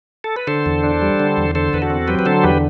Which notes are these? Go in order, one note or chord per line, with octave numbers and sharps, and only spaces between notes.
A4
B4
D3 A4 C5
E2
D4
G3
D3
E2
D3 A4 C5
E2 B4
F#4 A4
C4
F#3 G4 B4
B4
D3 A4 C5
E2 G4 B4